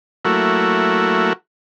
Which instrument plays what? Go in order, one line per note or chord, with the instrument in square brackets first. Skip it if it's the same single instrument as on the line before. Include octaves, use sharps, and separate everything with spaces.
[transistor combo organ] F#3 A3 A#3 E4 F#4